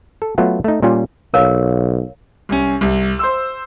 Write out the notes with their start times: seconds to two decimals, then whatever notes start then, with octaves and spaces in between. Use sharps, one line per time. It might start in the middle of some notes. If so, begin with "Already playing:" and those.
0.22 A4
0.38 F#3 A3 B3 F4
0.64 A3 D#4
0.82 A#2 G3 C#4 F4
1.34 B1 A#4 C#5 F5
2.49 C2 C#4
2.81 C2
3.19 C5 C6 E6